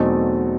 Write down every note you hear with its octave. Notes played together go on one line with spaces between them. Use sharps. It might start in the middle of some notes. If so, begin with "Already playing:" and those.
Already playing: E2 B2 F#3 A3 C4 D#4